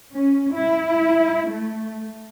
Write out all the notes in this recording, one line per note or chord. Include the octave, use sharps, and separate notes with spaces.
C#4
E4
A3